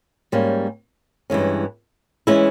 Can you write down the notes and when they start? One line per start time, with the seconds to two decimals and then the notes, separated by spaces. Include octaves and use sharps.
0.32 G#2 G3 A#3 C#4
1.30 G2 E3 G#3 C#4
2.27 E3 G#3 C#4 E4